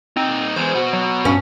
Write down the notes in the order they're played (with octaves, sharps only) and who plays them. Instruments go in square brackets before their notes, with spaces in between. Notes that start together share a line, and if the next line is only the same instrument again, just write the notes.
[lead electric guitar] A#2 D#4 [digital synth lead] C4
[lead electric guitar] E2 G#3 [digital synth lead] C5
[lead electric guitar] B2 F#4
[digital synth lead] F#3
[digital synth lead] G2 [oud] C#4